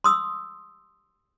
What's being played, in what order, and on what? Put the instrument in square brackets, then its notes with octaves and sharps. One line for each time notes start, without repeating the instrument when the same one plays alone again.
[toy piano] C6 D#6 E6